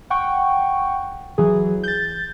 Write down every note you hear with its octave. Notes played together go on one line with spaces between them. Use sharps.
F#5 G5 C#6
E3 F#3 G#4
G6 A6